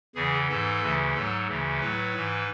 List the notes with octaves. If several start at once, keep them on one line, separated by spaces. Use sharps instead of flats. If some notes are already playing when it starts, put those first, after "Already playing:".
E2 C#3 E3 G#4
G#2 E3 A4
D2 C#3 E3
G#2 F#3 A4
D2 C#3 E3
A2 F#3 B4
G#2 E3